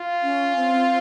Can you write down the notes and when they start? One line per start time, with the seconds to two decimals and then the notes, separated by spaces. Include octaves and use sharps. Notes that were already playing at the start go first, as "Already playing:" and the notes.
Already playing: F4
0.23 C#4
0.56 C4